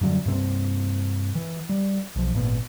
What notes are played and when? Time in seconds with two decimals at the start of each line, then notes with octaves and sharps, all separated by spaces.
0.01 F#2 D3 F#3 G3
0.26 G2 C3 A#3 C4
1.35 E3
1.69 G3
2.16 B1 F3
2.33 G#1 A#2 B3